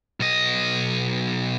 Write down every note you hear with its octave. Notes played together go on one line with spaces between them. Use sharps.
B1 D#5